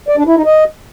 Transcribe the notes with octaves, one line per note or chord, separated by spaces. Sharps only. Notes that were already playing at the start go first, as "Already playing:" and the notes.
D5
D4
E4
D#4
D#5